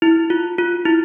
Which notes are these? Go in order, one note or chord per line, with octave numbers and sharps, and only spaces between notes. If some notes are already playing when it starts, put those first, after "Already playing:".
E4
F4
F4
E4